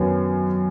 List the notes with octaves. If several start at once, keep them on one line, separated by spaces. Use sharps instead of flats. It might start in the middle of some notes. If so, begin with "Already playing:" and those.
Already playing: F#2 D#3 F#3 B3 F#4